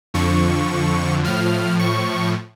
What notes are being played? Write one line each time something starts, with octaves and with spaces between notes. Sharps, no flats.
F2 D3 F3 C#6
A2 F3 F6
C#6